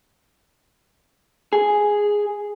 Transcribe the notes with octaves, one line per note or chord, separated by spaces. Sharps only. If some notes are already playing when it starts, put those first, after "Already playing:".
G#4